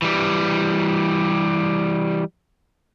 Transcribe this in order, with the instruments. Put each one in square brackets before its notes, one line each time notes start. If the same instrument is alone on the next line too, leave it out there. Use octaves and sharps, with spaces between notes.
[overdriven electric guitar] E3 G3